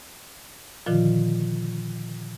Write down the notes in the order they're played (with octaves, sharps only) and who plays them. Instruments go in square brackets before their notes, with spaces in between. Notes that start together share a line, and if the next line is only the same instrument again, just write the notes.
[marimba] A#2 D3 D#3 F3 F4